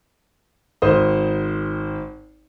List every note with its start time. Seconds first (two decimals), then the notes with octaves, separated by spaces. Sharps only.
0.82 G#1 C5 D#6